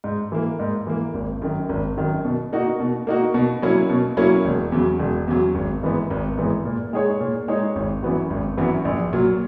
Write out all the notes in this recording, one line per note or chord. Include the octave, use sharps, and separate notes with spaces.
G#2
E3 A#3
G#2
E3 A#3
G#1
F#2 D#3
G#1
F#2 D#3
B2
A#3 D#4 F#4
B2
A#3 D#4 F#4
B2
F#3 A#3 C#4 E4
B2
F#3 A#3 C#4 E4
E1
E2 C#3 F#3
E1
E2 C#3 F#3
G#1
G#2 E3 B3
G#1
G#2 E3 B3
A#2
G#3 D#4 G#4 C#5
A#2
G#3 D#4 G#4 C#5
G#1
F#2 E3 B3 F#4
G#1
F#2 E3 B3 F#4
A#1
A#2 F#3